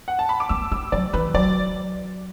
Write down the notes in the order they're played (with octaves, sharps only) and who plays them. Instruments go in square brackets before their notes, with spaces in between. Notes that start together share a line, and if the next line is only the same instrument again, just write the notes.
[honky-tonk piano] F#5
A5
B5
D6
[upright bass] B3 [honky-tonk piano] E6
[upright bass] B3 [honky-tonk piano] E6
[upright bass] F#3 [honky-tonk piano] D5
[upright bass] E3 [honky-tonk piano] B4
[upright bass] F#3 [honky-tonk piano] D5